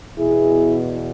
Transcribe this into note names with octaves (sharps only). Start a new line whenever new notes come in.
E2 B2 E4 G#4